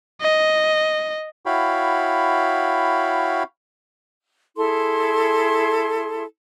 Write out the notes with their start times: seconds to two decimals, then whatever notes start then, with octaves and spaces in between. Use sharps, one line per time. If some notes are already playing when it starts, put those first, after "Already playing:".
0.21 D#5
1.46 E4 F#4 C#5 F5 G5 B5
4.57 E4 G#4 A4 C6